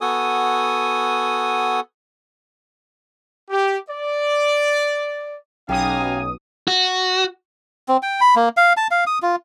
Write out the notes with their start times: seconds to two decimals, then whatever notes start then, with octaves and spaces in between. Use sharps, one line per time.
0.01 B3 F#4 A4 G#5 D#6
3.50 G4
3.90 D5
5.69 B1 C#4 G4 F5 G#5 A#5 D#6
6.68 F#4
7.88 C4
8.02 G5
8.21 B5
8.36 A#3
8.57 F5
8.77 A5
8.91 F5
9.07 D#6
9.22 F4